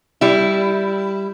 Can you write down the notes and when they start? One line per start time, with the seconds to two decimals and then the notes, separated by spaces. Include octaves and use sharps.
0.21 G3 E4